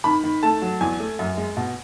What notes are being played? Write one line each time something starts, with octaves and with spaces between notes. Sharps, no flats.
D#3 B5
D#3
A3 A5
F#3
E2 G#5
A3
F#2
G#3
B2